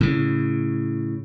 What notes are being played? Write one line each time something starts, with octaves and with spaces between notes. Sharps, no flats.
A2 C#3